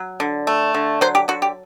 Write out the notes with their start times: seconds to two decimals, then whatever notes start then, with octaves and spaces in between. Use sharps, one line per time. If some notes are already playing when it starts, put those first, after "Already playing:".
Already playing: F#3
0.20 D3
0.47 A3
0.74 D3
1.01 F#3 C5
1.15 G4
1.28 D3 F#4
1.42 G4